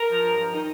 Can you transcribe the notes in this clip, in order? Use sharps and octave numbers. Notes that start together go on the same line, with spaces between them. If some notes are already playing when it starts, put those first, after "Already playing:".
Already playing: A#4
F3
G2
F3
D#3 D#4